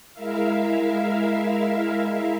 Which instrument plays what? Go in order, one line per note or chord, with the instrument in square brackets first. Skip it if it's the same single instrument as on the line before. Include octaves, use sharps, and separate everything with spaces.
[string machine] G#3 E4 A#4 E5 F5